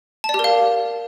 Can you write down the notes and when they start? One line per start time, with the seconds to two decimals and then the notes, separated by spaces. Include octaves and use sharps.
0.24 A5
0.29 D5
0.34 G4
0.39 A#4
0.44 F5